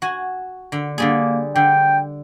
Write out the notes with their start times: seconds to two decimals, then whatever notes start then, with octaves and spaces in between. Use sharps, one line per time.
0.02 F#4 G#5
0.72 D3
0.98 D3 G3 A#3 G#4
1.55 D3 G5